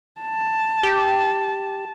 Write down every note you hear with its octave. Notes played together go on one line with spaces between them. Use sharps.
A5
G4